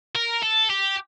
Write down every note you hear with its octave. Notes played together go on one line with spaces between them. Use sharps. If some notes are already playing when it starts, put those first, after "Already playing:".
A#4
A4
G4